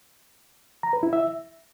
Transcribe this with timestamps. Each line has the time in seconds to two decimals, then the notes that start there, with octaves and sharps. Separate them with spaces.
0.83 A#5
0.93 B4
1.03 E4
1.13 E5